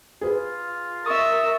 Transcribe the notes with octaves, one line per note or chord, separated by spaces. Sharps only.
F4 G#4 B4
A#4 E5 C#6 D#6 A6